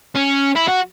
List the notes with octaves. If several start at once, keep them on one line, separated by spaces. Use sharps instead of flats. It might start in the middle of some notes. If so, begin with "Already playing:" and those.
C#4
E4
F#4